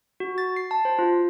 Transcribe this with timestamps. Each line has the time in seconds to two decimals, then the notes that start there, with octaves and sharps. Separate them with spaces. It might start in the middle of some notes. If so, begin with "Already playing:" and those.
0.20 F#4
0.38 A6
0.56 C7
0.71 A5
0.85 C5
0.99 F4